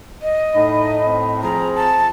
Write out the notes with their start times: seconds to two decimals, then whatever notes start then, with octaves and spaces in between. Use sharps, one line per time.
0.22 D#5
0.55 A2 D#4 B5
1.07 C4
1.42 F3 G#4 A#5
1.76 A5